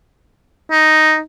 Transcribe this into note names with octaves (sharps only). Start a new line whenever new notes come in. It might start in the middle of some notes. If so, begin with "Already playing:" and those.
D#4